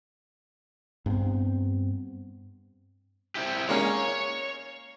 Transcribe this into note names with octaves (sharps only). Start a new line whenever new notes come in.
G2 B3 C4
C4 E4 G4
G#3 A#3 C#4 C#5